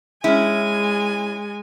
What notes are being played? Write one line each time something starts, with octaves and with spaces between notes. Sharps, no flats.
G#3 C#4 E4 G#5